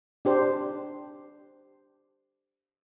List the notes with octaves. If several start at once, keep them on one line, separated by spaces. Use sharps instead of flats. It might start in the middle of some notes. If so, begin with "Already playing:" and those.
D4 G4 C5